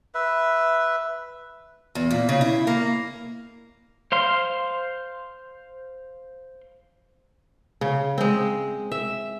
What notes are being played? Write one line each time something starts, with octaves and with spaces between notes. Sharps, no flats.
B4 E5
E2
A#2
C#3
E4
A#3
C5 F5 C6
C#3
G#3 C4
E5